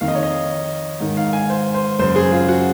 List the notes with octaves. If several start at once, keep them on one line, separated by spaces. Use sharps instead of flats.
F2 D#3 F5
D#5
C#5
D#5
G#2 D#3
F5
G#5
C5
C5
F#2 C#3 C5
G#4
F4
F#4